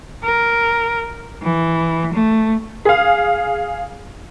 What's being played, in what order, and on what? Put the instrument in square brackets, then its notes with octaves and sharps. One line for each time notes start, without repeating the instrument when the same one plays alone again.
[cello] A#4
E3
A3
[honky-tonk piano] G#4 F5